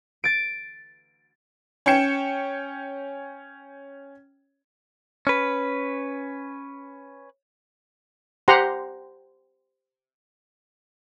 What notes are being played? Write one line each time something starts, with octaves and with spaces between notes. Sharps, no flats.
A6 D7
C#4 C#5 G5 C#7 E7
C#4 B4
G4 C5 F#5 A#5 C6